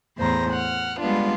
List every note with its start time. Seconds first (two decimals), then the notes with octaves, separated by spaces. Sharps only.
0.18 E2 A2 C5 A#5
0.51 F#5 F6
0.99 G3 G#3 B3 D4 F4